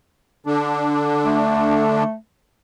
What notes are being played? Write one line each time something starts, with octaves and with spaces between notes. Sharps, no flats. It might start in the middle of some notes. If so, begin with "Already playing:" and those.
D3 D4
A3